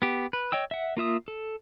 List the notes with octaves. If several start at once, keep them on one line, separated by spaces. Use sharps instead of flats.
B3 G4
B4
C#5 D#5 G5 E6
E5 F#5
A#3 F4 E5 D#6
A4